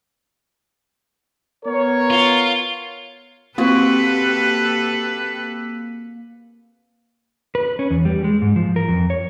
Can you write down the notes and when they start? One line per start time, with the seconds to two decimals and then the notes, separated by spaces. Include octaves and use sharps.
1.65 B3 A#4 C#5
2.10 F4
3.58 A#3 C4 F#4 G4 A4 B4
7.55 B4
7.79 C#4
7.90 E2
8.05 G3
8.24 G#3
8.42 G#2
8.56 F3
8.76 A#4
8.88 F2
9.10 C#5